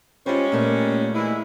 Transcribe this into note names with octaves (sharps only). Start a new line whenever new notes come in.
G3 G#3 C#4 F4 C5
A#2 A3 A#3
E3 G#3 E4